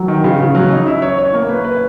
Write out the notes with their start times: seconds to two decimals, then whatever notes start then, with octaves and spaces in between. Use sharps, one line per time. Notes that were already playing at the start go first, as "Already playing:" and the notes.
Already playing: E3 F#3
0.08 D#3
0.23 C#3 E3
0.40 C#3 E3
0.55 F#3
0.66 C#3 D#4
0.87 E4
1.02 C#5
1.18 C#5
1.34 A#3
1.49 B4
1.64 B4